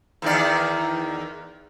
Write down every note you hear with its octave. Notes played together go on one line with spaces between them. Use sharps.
E2 D#3 D5